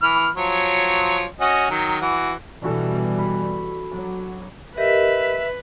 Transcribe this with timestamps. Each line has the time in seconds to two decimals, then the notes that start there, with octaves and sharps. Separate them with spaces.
0.02 E3 B5 F6
0.36 F3 F#3 C#5
1.40 C#4 F#4 D#5
1.71 D#3 F#3
2.01 E3 F#4
2.62 B2 E3 G3 D4 F#4 A4
3.18 B5
3.92 F#3 D6
4.78 G4 A#4 B4 D#5 E5